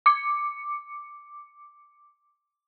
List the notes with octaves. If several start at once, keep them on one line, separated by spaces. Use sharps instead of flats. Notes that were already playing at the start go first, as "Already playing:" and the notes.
D6 C#7